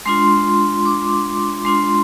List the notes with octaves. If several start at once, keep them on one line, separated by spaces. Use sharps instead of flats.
G#3 D4 F4 C6
D6
G#3 D4 F4 C6